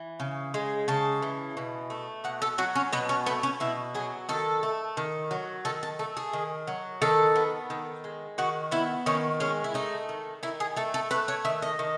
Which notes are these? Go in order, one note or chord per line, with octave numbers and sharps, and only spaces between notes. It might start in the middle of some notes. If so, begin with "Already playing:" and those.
Already playing: E3
C#3
G#3
C#3 A5
E3
B2
A3
B2 F#5
A4
F#3 F#4
C#4
B2 B3
C#4
A3 B3
C#4
B2 E4
F#3 G#4
D#3 A4
A3
D#3
F#3
D#3 A4
A4
A3 A4
G#4
D#3
F#3
D#3 A4
B3
D#3
G#3
D#3 F#4
B3 E4
D#3 C#4
G#3 C#4
E4
A3 D#4
D#3
D#3 E4
G#4
A3 A4
A4
A3 B4
C#5
D#3 E5
D#5
D#3